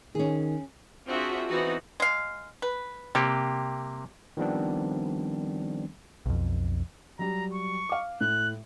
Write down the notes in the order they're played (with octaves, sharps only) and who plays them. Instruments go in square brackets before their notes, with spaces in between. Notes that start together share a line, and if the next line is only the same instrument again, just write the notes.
[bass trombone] D#3 [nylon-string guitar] C#4 G#4
[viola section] C4 D4 F4 F#4 G#4 E5
E3 B3 C4 D#4 F#4
[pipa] G#3 F5
B4
[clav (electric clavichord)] C3 A#3 G4 [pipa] G3
[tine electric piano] D#3 F3 G3 B3 C4 D4
[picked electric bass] B1 F2
[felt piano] F#3 G3 [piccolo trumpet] A#5
[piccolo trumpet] C#6
[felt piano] F5 D6
[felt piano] A2 [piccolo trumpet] F#6